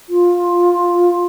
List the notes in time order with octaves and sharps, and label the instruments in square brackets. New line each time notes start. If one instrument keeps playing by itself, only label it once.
[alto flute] F4